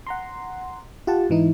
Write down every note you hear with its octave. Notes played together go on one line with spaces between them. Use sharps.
F#5 A#5 C6
F4 G4 F#5 A5
G#2 E3 D#4 E4